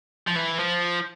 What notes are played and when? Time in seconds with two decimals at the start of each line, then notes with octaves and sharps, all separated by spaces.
0.28 F3
0.36 E3
0.58 F3